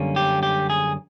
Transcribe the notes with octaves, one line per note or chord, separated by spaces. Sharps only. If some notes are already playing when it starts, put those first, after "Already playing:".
Already playing: F#2 D3 G3 A#3 C#4
G4
G4
G#4